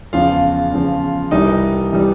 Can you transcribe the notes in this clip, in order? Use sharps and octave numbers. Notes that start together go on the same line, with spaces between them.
E2 C#3 F3 F4 F5
E2 C#3 F3
C2 C3 E3 G3 D#4 D#5
C3 E3 G3